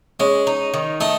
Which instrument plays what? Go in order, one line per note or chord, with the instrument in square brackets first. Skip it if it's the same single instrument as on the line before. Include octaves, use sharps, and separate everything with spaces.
[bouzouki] G#3 [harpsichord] C#4
[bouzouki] D#4
D#3
[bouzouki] A3 [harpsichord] D#4